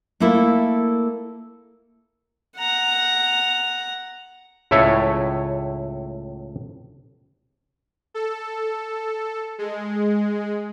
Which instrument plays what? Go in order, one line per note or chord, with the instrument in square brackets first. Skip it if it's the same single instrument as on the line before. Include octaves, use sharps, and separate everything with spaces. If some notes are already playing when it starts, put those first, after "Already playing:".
[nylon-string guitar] A3 A#3 E4 A4 A#4
[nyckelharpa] F#5 A#5
[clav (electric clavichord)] C#2 A2 A3 E4 C#5 E5
[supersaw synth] A4
G#3